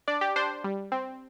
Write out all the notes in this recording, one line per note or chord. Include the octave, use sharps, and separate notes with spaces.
D4 D5
G4
D4 C5
G3
C4